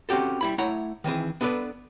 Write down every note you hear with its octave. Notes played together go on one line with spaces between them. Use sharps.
C4 C#4 F#4 G4 A4
G3 E4 B5
A3 E4 C#5 F#5 A#5
D#3 E3 C4 G#4
B3 D4 A4 B4 D5